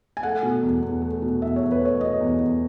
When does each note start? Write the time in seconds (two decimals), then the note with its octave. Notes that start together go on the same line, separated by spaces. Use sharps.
0.17 G#5
0.23 A3 F#5
0.43 B2
0.63 E2
0.82 E2
1.02 A3
1.22 B2
1.42 E2 E5
1.56 E2 C#5
1.72 B4
1.81 A3 C#5
2.00 B2 D#5
2.20 E2
2.39 E2